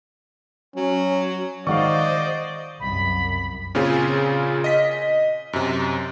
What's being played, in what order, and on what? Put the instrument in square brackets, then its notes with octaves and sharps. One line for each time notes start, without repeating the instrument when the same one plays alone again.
[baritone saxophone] F#3 [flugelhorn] C#4
[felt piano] D#3 G#3 [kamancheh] C5 D#5 [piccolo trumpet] D5 [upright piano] F5 F#5 C#6
[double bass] C2 F#2 [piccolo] B5
[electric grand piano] A#2 C#3 C4 C#4 F4 G#4
D#5 B6
F#2 C3